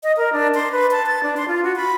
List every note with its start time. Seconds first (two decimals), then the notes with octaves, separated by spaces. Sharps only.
0.03 D#5
0.17 A#4
0.33 D4
0.55 C6
0.72 B4
0.91 A5
1.07 A6
1.23 D4
1.37 C6
1.48 F4
1.64 F#4
1.76 B5